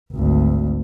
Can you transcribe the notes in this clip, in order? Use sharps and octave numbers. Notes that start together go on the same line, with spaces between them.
G#1 D2